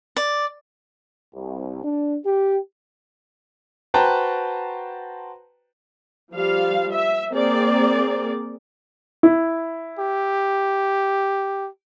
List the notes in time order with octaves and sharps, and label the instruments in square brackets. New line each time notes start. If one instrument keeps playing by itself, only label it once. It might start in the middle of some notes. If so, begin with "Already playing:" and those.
[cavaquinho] D5
[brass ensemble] C2
D4
G4
[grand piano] F#4 B4 C5 G5 A5 A#5
[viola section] F3 G3 F5
E5
A#3 C4 G#4 A#4 D5
[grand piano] E4
[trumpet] G4